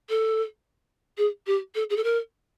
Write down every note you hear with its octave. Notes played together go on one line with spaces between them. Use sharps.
A4
G#4
G4
A4
G#4
A4
A#4